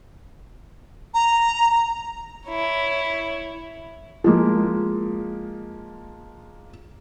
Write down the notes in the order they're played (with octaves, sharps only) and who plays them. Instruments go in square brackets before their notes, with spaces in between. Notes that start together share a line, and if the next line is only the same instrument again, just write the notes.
[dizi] A#5
[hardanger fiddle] E4 C#5
[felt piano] F3 G#3 A#3